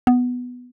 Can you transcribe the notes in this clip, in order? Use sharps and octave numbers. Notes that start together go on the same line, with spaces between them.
B3